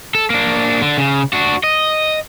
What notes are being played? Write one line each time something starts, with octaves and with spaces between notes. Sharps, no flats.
A4
A#3 D4
D3
C#3
D4 F#4
D#5